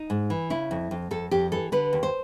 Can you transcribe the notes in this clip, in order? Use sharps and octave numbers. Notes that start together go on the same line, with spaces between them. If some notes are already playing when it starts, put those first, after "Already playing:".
Already playing: D#4
G#2
E3
C#3 E4
F2
F2
F2 A4
F2 G4
E3 A4
D3 B4
D#2
C5